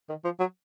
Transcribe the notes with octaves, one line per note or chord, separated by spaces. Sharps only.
D#3
F3
F#3